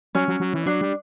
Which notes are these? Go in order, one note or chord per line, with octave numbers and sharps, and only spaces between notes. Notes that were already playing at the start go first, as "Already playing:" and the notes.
F#3 C#4
F#3
F#3
E3
F#3 D4
G3